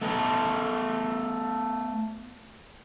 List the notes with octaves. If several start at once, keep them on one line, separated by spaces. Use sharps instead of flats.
A3 B3 A4 B4 D#5